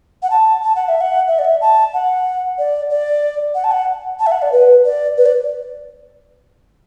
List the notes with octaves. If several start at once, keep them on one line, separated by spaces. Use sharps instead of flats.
F#5
A5
A5
F#5
E5
F#5
E5
D5
E5
A5
F#5
D5
D5
F#5
A5
F#5
A5
E5
F#5
D5
B4
D5
B4
D5